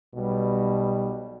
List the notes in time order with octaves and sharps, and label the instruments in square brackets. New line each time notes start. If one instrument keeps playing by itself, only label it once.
[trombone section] B1 B2 G3